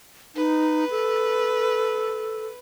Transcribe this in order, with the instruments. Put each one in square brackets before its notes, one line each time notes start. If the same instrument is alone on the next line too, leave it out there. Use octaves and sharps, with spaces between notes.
[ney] D#4 [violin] B4
[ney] A4